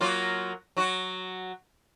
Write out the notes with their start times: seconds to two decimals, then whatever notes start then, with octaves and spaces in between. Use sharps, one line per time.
0.01 F#3 A#3 F4
0.77 F#3 F#4